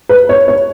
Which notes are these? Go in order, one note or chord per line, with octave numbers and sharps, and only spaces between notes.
B4
C#5
C#5